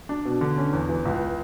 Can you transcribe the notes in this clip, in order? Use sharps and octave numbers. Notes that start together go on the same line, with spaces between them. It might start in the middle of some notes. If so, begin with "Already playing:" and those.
D4
B2
D3
C#4
E2
E3
C#2